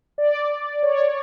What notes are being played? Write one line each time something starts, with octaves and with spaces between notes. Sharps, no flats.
D5
C#5